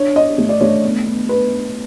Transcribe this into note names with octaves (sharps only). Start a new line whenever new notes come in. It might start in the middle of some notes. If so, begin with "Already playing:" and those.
Already playing: D4 C#5
D4 D#5
A3
D5
A3 C#5
B3
B3
B3 B4